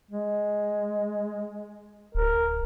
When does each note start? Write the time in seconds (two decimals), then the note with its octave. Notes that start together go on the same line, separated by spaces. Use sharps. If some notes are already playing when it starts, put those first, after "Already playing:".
0.11 G#3
2.15 D1 A#4